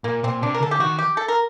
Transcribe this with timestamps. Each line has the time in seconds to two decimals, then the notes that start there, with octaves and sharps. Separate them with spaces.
0.04 A#2 A#3
0.23 A#2 C4
0.42 C3 D4
0.54 A#4
0.61 D3 A4
0.71 G4
0.80 D#3 F#4
0.98 G4
1.17 A4
1.28 A#4